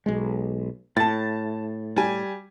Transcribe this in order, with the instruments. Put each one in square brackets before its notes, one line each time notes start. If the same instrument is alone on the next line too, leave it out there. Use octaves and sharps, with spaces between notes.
[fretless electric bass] B1 G#3
[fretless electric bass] A2 [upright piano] A5 A6
[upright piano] G3 G#5